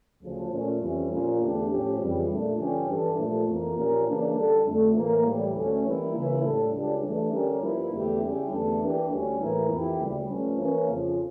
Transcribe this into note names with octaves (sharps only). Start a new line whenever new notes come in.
D2 C#3 F3
A#2 A3 C#4
F2 E3 G3 C#4 E4
A#2 F3 A#3 C#4 F4
E2 D3 A3 D4 G4
A2 F3 C#4 G4
F2 C#3 E3 G3
A#2 A3 D4
G2 D3 F3 C#4 G4
G2 E3 G3 D4 A4
A#2 F3 A3
F2 E3 A#3
A#2 F3 C#4 G4 A#4
C#3 E3 A#3 D4
D3 G3 D4 A4
F2 D3 A3
A2 E3 A#3
A2 E3 G3
D2 D3 A3 C#4
E3 G3 A#3 E4
C#3 E3 A#3 C#4 E4
A2 G3 D4 A4
C#2 C#3 G3 D4
E3 A3 D4
D3 G3 C#4 G4 A#4
G2 F3 A#3 E4
E2 D3 A3 E4 G4
C#3 G3 C#4 E4 G4
E2 D3 A3 D4 A4
E3 A#3 D4 G4
D2 D3 G3 C#4
A2 E3 A#3 E4 A#4
F2 E3 A#3 E4 G4
D2 C#3 G3
G2 F3 A3 C#4
E3 A#3 C#4
F2 C#3 F3